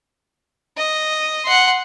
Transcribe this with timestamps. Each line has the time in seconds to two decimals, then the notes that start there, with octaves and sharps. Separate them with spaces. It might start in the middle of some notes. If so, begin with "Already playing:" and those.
0.77 D#5
1.45 F#5 C6